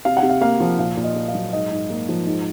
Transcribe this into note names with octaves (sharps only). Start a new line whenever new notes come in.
C3 F5
F#5
C3
F5
A#3 F5
F3
A#2 F5
A#2
D#5
A#3
F5
F#3
G#2 D#5
G#2
A#3
F3
G#2